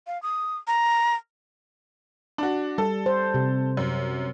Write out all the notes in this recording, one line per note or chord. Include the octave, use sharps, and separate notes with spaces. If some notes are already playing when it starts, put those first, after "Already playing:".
F5
D#6
A#5
D4 F#4
G3 A4
C5
C3
F#2